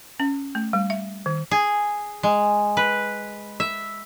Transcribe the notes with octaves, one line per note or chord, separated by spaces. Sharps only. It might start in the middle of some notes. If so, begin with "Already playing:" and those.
C#4
A3
G3
E5
D#3
G#4
G#3
B4
E5